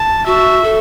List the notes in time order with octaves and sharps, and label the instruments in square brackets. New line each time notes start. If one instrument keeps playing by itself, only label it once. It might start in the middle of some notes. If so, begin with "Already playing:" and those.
Already playing: [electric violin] A5
[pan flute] F#4 [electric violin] E5
[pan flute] A4